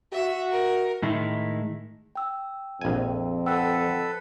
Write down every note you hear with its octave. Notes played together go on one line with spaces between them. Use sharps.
F#4 E5
A#4
A2 D#3 G#3 E4
G5 E6
A#1 F2 G#5
A4 B4 F#5 G5 E6